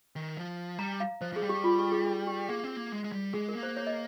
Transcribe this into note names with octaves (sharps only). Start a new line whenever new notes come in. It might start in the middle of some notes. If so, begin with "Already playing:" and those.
D#3
F3
G3 A#5
F5
F3 C5
F3 G#4
G3
G4
F4
G4
G#4
G#4
G4
A#3 G#4
C4
A#3
G#3
G#3
G3
G#3 G#4
A#4
A#3
C5
C#5
D#5